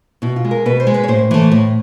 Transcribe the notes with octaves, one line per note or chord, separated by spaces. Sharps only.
B2 E4
F4
G#3
A#4
B2 B4
C5
G#3
B4
C#5
A2 C5
E3 A3
A2